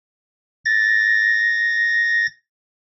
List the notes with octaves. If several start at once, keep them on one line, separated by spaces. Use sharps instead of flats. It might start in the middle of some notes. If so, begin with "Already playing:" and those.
A6 A#6